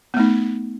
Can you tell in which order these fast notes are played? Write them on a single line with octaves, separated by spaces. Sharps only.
B3 A3 D#4